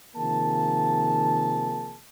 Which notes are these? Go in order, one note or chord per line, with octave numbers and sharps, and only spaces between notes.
C3 D#3 F3 A#3 G#4 A5